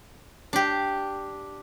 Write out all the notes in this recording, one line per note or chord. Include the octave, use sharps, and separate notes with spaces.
D4 G4